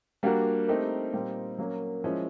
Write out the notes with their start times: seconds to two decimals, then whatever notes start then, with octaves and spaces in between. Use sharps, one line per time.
0.23 G3 A#3 D4 F#4 A#4
0.68 A3 C4 D#4 G4 A#4
1.13 A#2 G3 C4 D#4
1.58 F#3 A#3 C#4
2.04 F3 G#3 C#4 E4